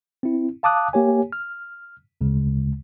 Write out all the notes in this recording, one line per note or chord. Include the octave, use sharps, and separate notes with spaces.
C4 E4
F5 A5 D6 D#6 F#6
A#3 G4 C#5 G#5
F6
D2 C#3 G#3